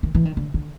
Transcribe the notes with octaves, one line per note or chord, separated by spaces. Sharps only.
D#3
E3
D#3
D3
D3